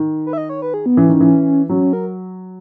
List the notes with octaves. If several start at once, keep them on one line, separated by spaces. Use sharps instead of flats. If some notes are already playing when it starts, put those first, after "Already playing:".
Already playing: D#3
B4
E5
D#5
C#5
B4
G#4
B3
E3 C#4
D#3
E3
F#3 C#4
A#4